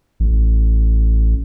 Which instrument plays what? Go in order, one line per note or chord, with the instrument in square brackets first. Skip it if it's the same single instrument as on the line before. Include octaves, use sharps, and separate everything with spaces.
[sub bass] A1